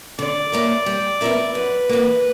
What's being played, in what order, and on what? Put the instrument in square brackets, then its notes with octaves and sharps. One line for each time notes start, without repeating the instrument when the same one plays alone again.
[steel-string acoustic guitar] D3 [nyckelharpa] D5
[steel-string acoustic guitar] A#3 C#4 E4 A#4
G3
B3 E4 A#4 E5
[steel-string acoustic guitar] F#2 [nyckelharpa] B4
[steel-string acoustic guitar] E3 A#3